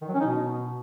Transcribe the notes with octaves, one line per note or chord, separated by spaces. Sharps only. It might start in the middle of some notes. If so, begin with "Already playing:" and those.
D#3
F#3
C#4
D#4
B2